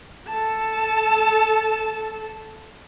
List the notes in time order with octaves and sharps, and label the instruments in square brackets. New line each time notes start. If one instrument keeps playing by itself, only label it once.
[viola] A4 A5